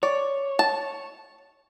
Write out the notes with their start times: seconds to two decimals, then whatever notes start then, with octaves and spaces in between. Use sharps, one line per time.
0.03 C#5 D5
0.59 A5